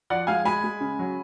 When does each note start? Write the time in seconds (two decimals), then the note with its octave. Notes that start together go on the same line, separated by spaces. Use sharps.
0.10 F3 D5 F#5
0.27 G#3 F5 G#5
0.45 G#3 G#5 B5
0.64 G#3
0.81 C#3
0.99 F#3